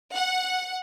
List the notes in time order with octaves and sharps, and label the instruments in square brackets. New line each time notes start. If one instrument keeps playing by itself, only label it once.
[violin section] F#5